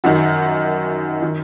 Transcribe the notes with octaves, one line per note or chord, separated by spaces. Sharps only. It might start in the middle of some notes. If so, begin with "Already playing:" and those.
F#2 D#3 F#4
D#3